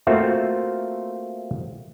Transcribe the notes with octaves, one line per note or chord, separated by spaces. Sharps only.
A3 A#3 C4 F4 F#4 E5